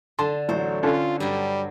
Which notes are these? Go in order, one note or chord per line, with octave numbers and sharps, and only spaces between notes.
D3 A5 C6
A1 F#3 C5
D3 C#4 F4 A4
G2 F#3 G3